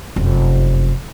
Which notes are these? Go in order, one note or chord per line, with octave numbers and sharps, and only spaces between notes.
F1 F#2